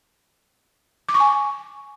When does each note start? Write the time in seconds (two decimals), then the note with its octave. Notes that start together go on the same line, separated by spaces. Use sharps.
1.09 D6
1.14 C#6
1.20 G#5